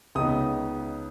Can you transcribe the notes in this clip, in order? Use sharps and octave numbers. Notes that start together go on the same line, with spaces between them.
C#2 C#3 B3 D#4 D#6